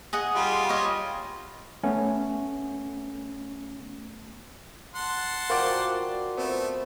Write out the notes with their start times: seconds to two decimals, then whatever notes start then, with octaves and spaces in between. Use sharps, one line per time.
0.13 G#4 D#5 F#5
0.35 G3 F4
0.69 C#5 D#5
1.83 A3 B3 C#4
4.95 F#5 A5 C6
5.50 F4 F#4 A#4 C5 D5 G5
6.37 A3 B3 C4